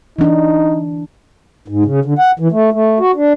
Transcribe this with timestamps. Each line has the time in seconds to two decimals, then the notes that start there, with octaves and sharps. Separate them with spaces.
0.19 E3 D4 D#4
1.68 G#2
1.85 C#3
2.05 D3
2.19 F#5
2.39 E3
2.52 A3
2.73 A3
2.99 F#4
3.16 D4